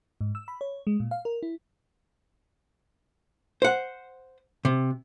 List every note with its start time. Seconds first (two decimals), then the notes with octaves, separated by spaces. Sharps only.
0.21 G#2
0.35 E6
0.48 B5
0.61 C#5
0.87 G#3
1.00 A#2
1.11 F5
1.25 A#4
1.43 E4
3.62 C5 F#5
4.65 C3